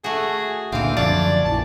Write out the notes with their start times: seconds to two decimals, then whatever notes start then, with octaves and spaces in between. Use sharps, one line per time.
0.04 A3 F#4 G#4
0.72 C#2 A#2 D3 E3 C4 F5
0.97 F#2 D3 F3 D4 C#5 D5
1.45 A#1 D#3 E3 A5